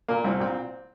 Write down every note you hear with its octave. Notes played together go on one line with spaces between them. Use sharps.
A#2 A#3
C2 C4
A#2 C4